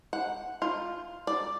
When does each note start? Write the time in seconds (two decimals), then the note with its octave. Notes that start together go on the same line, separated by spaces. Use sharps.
0.13 F#5
0.62 F4
1.27 D5